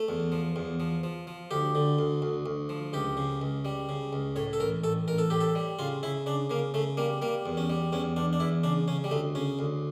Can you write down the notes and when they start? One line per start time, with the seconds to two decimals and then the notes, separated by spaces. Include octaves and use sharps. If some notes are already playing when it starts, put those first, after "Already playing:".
Already playing: A3
0.08 E2
0.32 F3
0.56 E2
0.80 F3
1.03 F3
1.27 F3
1.51 D2 G4
1.75 D3
1.99 D2
2.22 D2
2.46 D2
2.69 F3
2.93 C#2 G4
3.17 C#3
3.41 C#2
3.65 G3
3.89 C#3
4.13 C#2
4.36 A2 C#5
4.53 A4
4.60 A1 A#4
4.84 A1 A4
5.08 A1 A#4
5.18 A4
5.30 A2 G4
5.41 A4
5.55 G3
5.79 C#3 F4
6.03 C#3 E4
6.26 C#3 D4
6.50 C#3 A#3
6.74 C#3 A3
6.97 G3 A#3
7.22 G3 A#3
7.46 E2
7.57 C#4
7.70 G3
7.93 E2 C#4
8.16 E2 D4
8.33 D4
8.40 E2 E4
8.64 C#3 D4
8.88 C#3 C#4
9.04 G3
9.11 D2 A3
9.35 C#3 C#4
9.59 D2